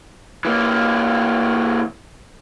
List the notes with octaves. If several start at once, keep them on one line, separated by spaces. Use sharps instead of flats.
E3 A#3